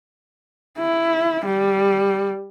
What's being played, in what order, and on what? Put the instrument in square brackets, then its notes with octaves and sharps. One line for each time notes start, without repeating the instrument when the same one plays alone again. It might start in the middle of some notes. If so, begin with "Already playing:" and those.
[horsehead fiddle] E4
G3